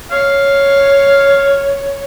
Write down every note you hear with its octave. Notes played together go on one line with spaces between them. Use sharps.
C#5 F5